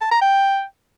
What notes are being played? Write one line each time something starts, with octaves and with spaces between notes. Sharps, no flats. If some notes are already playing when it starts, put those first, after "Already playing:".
A5
A#5
G5